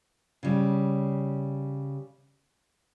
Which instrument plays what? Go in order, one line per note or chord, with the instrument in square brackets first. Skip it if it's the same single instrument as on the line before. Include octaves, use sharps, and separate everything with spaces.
[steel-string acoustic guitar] C#3 G3